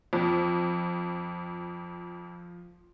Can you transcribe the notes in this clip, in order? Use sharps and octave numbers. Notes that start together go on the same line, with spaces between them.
F2 F3